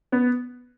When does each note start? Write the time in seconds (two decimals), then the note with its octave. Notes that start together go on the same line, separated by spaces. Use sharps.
0.12 B3